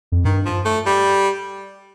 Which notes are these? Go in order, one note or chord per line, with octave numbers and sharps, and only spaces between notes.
F2
G2 D#3
F3
A3
G3